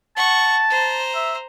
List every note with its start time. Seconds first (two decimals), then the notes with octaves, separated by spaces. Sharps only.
0.17 F#5 A5 C#6
0.70 C5 A#5
1.15 E5